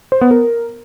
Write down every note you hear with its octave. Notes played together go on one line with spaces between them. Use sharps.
C5
B3
A#4